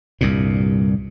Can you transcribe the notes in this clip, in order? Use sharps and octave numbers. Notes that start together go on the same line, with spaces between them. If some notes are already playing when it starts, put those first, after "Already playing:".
C2 G2 A#2